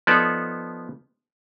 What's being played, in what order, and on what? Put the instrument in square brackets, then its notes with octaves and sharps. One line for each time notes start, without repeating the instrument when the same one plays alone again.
[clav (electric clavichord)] F3 B3 D#4 A4 D5